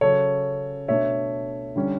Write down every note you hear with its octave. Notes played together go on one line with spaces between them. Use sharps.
C#3 F#3 C#4 A4 C#5
B2 A3 D4 C#5 E5
D3 G3 C#4